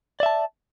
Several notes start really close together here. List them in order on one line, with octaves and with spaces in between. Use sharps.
D5 E5 A5